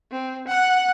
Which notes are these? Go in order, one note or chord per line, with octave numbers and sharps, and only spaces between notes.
C4
F#5 F#6